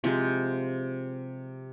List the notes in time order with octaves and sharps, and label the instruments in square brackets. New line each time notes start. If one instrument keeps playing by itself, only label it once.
[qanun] C3 F3 G#3